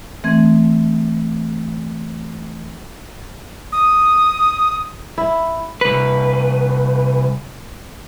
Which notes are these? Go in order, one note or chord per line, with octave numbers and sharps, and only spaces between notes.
E3 A3 C4 G#6
D#6
E4
C2 B4